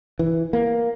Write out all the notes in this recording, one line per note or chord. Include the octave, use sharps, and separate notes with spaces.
E3
A#3